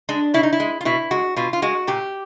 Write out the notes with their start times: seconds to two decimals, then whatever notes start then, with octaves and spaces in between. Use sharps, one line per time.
0.09 G#3 D4
0.34 B2 E4
0.43 D#4
0.53 E4
0.60 G#3
0.81 F4
0.85 B2 E4
1.11 G#3 F#4
1.36 B2 F4
1.53 F4
1.62 G#3 F#4
1.87 A#2 G4